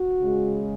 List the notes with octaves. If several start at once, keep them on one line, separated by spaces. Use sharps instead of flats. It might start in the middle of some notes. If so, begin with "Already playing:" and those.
Already playing: F#4
C#3 G#3